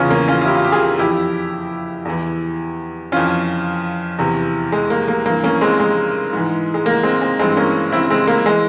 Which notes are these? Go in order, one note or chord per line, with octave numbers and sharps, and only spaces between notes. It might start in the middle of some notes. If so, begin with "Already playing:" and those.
Already playing: E2 C#3 E3 C#4 F4
A#3 C#4
C#4 F4
F4
E4 G4
F4
G4
F4 G#4
F2 E3 E4 G4
E2 E3
F2 E3 C#4 F4
E2 C3 E3
G#3
A#3
A#3
G2 E3 A#3
A#3 C#4
G#3 C4
G#3
G#2 E3
G#3
A#3
G#3 C4
G#3 C4
G2 E3 G#3 C4
A#3 C#4
C4 E4
G#3 C4
A#3
E3 G#3